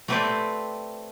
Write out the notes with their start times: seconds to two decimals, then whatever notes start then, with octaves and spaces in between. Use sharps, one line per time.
0.08 A3 C4 G4 B4 C5 D5